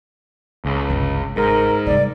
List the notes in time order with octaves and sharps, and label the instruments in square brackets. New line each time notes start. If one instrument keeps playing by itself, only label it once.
[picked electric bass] C#2
[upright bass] G1 C3
[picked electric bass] G#2 [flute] A#4
[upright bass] G2 C3 [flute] D5